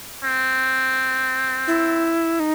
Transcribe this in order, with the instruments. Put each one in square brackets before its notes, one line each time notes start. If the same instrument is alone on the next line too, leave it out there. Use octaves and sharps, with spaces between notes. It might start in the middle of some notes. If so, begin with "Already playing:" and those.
[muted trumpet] C4
[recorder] E4
D#4